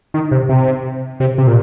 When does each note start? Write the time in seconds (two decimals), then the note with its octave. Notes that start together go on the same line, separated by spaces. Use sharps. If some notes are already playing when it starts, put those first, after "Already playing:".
0.14 D#3
0.31 C3
0.49 C3
1.20 C3
1.38 C3
1.47 A#2